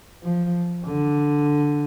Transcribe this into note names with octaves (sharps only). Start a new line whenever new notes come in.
F3
D3